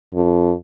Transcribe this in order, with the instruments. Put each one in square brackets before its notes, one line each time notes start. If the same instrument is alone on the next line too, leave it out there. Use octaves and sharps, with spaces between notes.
[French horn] F2